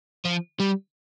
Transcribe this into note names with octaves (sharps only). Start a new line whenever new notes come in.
F3
G3